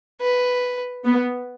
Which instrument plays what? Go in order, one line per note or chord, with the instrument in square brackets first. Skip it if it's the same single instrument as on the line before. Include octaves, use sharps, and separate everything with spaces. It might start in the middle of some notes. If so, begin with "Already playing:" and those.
[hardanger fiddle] B4
[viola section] B3